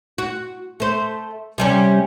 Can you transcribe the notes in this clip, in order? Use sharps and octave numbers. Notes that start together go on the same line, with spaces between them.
F#4
A3 C5
C3 G3 C#4